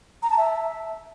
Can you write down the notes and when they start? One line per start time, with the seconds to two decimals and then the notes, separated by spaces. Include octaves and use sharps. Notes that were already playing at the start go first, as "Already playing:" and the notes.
0.23 A#5
0.30 A5
0.38 E5